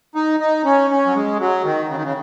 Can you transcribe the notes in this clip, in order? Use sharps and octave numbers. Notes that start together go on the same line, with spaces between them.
D#4
D#4
C#4
C#4
F#3
G#3
F#3
D#3
C#3
D#3
C#3